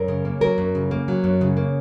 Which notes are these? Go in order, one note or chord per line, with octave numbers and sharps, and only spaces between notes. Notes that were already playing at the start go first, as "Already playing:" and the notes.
Already playing: F#2 A#4
C#3
A#3
F#3 A#4
F#2
C#3
A#3
F#3
F#2
C#3
A#3